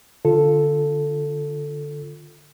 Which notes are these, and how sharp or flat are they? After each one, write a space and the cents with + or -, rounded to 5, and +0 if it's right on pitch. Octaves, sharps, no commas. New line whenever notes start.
D3 +0 F4 +10 A4 +0